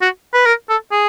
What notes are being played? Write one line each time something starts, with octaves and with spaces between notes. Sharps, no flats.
F#4
B4
A#4
A4
G#4